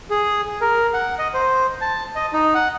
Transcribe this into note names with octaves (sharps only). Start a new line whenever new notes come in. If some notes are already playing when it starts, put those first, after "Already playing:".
G#4
A#4
F#5
D#5
C5
A5
D#5
D#4
F#5